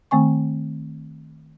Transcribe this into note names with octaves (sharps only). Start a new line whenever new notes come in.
D#3 A3 C4 G#5 C#6